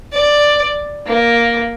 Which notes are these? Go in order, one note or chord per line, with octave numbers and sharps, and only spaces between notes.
D5
A#3